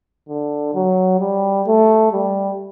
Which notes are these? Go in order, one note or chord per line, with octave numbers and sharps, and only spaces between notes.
D3
F#3
G3
A3
G3